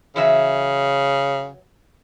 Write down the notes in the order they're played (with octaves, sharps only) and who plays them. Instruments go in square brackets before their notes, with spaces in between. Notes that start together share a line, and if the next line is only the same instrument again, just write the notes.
[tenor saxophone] C#3 [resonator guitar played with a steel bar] E3 F#3 E5